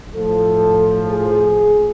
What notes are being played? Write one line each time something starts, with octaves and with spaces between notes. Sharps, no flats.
A2 F3 A4
G#4